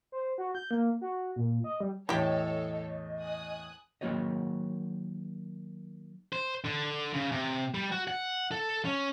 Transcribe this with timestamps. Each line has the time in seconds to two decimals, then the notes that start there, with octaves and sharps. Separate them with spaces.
0.12 C5
0.38 F#4
0.55 G6
0.71 A#3
1.01 F#4
1.36 A#2
1.64 D#5
1.81 G3
2.09 E2 A2 E4 G4 A4 C#5 D#5
3.22 G#5 D#6 F#6
4.01 D#3 F#3 A#3 F#4 C#5 D#5
6.33 C5
6.65 D3
7.14 C#3
7.32 C3
7.74 G3
7.92 F#4
8.08 F#5
8.51 A4
8.85 C#4